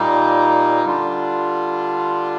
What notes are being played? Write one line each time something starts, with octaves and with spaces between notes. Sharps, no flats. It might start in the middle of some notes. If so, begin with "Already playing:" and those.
Already playing: A#2 G3 A#3 D#4
D3 G3 D4 F4